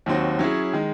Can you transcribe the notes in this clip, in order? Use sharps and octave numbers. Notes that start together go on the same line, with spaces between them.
D#2 D#3 F#3 C4 F#4
F#3 C#4 E4 G#4
D#3 G#3